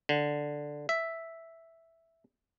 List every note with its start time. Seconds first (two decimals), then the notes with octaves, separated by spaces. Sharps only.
0.09 D3
0.89 E5